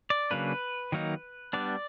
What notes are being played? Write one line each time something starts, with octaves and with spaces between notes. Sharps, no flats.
D5
C#3 F#3 A#3 D4 B4
D#3 F#3 A#3 D#4
G3 B3 D4 D5